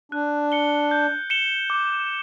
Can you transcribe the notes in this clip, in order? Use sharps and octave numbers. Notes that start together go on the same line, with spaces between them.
D4 F#6
C#7 G7
G6
C#7 E7 G7
D6